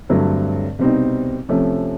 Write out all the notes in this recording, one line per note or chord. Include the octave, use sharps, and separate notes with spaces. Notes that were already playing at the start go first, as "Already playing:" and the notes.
G2 D3 F#3 A3 C4
C2 B2 G3 C4 D#4
C3 F3 A3 C#4